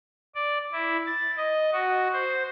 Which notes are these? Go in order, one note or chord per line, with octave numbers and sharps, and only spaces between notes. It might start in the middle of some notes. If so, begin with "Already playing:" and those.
D5
E4
A6
D#5
F#4
C5